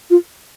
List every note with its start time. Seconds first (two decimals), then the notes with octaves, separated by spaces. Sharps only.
0.10 F4